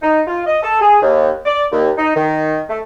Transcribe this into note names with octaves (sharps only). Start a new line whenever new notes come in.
D#4
F4
D#5
A4
G#4
D#2
D5
D#2
D#4
D#3
A3